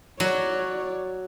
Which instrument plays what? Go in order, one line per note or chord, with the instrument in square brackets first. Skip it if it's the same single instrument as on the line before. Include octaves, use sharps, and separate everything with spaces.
[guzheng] F#3 [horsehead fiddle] C#5 D5